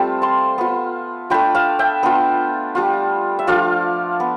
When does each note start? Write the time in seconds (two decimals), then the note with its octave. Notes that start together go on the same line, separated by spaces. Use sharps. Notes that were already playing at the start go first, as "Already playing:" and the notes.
Already playing: G3 A3 C4 F4 A4 C5
0.22 A5 C6
0.58 B3 F4
1.30 A3 D4 F4 G5 B5
1.55 F5 A5
1.79 E5 G5
2.03 B3 D4 F4
2.75 G3 D4 F4
3.39 E5
3.47 F3 A3 D4 F4 D5 F5
4.20 B3